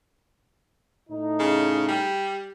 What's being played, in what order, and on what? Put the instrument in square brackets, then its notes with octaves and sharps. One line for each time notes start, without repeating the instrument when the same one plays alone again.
[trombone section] A2 D#4
[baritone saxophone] C#3
G3